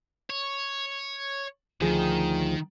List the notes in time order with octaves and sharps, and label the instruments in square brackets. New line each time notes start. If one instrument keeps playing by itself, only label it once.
[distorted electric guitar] C#5
[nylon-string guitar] D2 F3 G#4 [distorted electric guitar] D#3